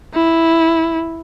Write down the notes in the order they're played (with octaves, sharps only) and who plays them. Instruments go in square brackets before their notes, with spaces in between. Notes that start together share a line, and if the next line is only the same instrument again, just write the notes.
[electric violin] E4